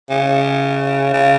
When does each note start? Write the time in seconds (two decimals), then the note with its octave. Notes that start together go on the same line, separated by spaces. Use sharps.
0.10 C#3
1.13 C#3